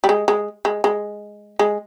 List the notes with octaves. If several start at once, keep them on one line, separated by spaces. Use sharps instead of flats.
G3
G#3
G#3
G#3
G#3
G#3